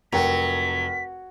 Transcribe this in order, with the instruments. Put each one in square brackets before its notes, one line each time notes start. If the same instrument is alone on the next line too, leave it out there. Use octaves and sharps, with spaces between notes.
[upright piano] F1 [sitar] F#3 [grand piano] A#4 G5 [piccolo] B6